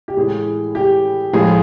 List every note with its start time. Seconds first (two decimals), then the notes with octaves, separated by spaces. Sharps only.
0.08 G4
0.17 A2 E3 G#3 G#4
0.75 G4
1.33 A2 F3 G#3 G#4